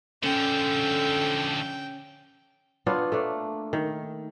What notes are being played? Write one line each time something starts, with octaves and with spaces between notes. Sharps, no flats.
D3 F3 C#4 A4 G5
B3 D4 F4 C#5
A3 A#3 D4
D#3